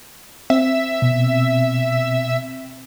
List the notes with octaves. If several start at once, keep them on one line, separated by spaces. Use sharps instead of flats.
C4 E5
B2